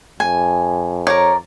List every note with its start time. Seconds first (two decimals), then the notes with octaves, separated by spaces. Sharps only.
0.20 F2 G#5
1.07 A#4 C#5 D5